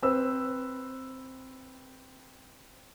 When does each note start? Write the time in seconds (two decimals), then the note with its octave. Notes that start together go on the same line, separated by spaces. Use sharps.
0.02 C4 B4 E6